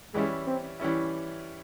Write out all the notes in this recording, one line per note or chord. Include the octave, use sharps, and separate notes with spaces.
E3 G3 G#3 C#4 E4
C4
E3 G3 C#4 E4